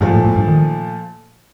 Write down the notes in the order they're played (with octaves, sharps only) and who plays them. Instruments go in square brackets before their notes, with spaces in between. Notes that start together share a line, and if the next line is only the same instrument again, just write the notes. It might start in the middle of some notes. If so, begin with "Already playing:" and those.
[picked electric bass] G2 [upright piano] A#2 F3 A3
[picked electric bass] A2
A2
G2
D#3